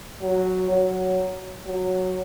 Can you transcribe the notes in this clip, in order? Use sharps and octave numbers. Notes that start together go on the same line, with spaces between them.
F#3
F#3
F#3